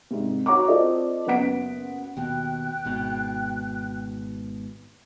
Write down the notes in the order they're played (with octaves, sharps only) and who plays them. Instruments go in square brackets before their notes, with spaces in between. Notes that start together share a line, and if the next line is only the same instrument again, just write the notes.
[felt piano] C2 G#2
F#4 C#5 F#5 A#5 C#6 D6
C4 F4 A4 D5 D#5
F#1 B3 B4 F#5 B6 D7
[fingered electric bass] D#2 B2 [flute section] G5 F#6
[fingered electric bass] G#1 G#2 B2